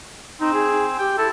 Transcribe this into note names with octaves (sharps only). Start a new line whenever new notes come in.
C4 D#4
G#4
G4 G5
E4 A4